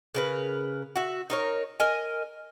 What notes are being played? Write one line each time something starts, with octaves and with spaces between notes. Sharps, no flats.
C#3 A#4 B4
F#4 E5
D#4 A#4 C#5
A#4 D#5 G#5